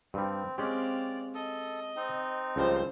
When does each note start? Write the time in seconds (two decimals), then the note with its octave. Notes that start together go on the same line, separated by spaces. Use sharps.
0.14 G2 G3 C4
0.58 G#3 C4 C#4 G4 D5 F5
1.34 A4 D#5
1.96 C4 D#4
2.56 C#2 F3 G3 F4 C5